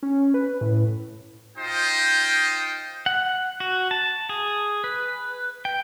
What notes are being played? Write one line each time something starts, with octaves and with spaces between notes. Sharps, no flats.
C#4
B4
A2
D#4 F4 C5 D#5 G5
F#5
F#4
A5
G#4
B4
G5